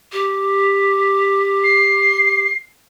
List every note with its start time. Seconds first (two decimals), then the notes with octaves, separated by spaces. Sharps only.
0.12 G4
1.63 C7